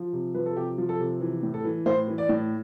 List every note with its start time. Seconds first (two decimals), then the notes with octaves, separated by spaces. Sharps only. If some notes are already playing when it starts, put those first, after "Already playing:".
Already playing: F3
0.13 C3
0.34 F3 B4
0.46 A4
0.57 C3 G4
0.78 F3
0.89 A4
1.00 C3
1.21 E3
1.43 A2
1.54 A4
1.64 E3
1.86 A2 C5
2.08 E3
2.18 D5
2.29 A2